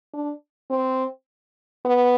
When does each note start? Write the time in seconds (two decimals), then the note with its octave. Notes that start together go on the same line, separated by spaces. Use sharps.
0.14 D4
0.70 C4
1.85 B3